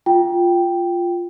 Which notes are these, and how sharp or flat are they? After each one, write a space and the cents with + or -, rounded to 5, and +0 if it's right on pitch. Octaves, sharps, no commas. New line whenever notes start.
F4 +0 G5 +0